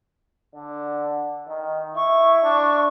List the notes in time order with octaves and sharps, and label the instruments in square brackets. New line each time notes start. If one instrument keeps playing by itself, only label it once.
[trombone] D3
D#3
[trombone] E4 [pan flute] C#6
[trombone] D4